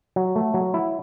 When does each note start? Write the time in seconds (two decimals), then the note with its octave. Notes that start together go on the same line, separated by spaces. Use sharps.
0.16 F#3
0.36 A3
0.54 F#3
0.74 E4